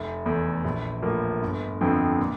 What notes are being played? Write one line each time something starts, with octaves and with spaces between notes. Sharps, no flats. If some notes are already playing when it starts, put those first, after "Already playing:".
Already playing: F1
E2 E3 A3
A#1
A2 F3 A#3
G1
F2 D3 F3 C4
A#2